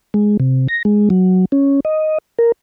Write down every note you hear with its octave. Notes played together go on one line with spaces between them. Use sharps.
G#3
C3
A#6
G#3
F#3
C#4
D#5
A#4